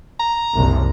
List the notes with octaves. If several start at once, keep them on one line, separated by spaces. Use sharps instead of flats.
A#5
F#1 C2